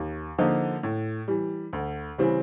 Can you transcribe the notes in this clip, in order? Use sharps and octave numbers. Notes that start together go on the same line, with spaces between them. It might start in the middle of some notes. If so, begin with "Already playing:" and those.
Already playing: D#2
D3 F3 A#3 D#4
A2
E3 G3
D2
C#3 E3 G3 C4